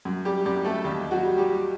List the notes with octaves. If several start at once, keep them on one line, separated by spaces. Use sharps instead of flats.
F#2
G3 G4
F#2 G3 G4
A3 A4
D#2 G3 G4
F#3 F#4
G3
G3 G4